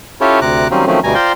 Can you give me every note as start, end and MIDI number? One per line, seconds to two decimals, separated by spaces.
0.21 0.40 61
0.21 0.40 64
0.21 0.40 65
0.21 0.40 67
0.21 0.40 69
0.21 0.40 73
0.42 0.68 38
0.42 0.68 48
0.42 0.68 82
0.42 0.68 86
0.42 0.68 90
0.71 0.85 51
0.71 0.85 54
0.71 0.85 55
0.71 0.85 58
0.71 0.85 60
0.71 0.85 61
0.87 1.00 51
0.87 1.00 53
0.87 1.00 54
0.87 1.00 57
0.87 1.00 60
0.87 1.00 61
1.04 1.15 38
1.04 1.15 47
1.04 1.15 55
1.04 1.15 80
1.04 1.15 82
1.15 1.32 65
1.15 1.32 72
1.15 1.32 74
1.15 1.32 79
1.15 1.32 82
1.15 1.32 84